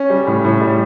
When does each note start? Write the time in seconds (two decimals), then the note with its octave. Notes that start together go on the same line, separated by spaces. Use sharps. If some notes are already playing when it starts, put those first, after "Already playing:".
Already playing: C#4
0.10 G3
0.27 A2
0.45 A2
0.61 G3